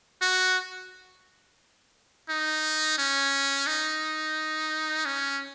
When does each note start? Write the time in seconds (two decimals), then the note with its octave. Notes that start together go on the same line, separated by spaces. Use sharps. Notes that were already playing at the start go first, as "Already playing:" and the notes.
0.22 F#4
2.29 D#4
2.98 C#4
3.67 D#4
5.05 C#4